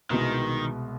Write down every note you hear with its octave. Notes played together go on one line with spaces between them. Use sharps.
C2 B2 D#3 G#3